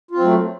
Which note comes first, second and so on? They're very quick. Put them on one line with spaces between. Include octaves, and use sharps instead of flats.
F4 C4 F#3 A3